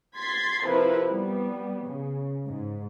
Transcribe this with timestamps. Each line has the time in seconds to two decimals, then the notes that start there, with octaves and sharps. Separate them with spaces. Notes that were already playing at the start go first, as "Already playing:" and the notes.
0.17 C6 G#6 A6 B6 C7
0.67 C3 F3 E4 A#4 B4
1.09 G3 B3
1.84 C#3
2.47 G#2